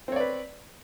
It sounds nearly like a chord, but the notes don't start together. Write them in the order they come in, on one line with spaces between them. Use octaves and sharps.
C4 C#5 D5 B4